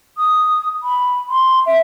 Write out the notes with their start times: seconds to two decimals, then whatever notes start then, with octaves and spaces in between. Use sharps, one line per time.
0.18 D#6
0.83 B5
1.30 C6
1.66 E5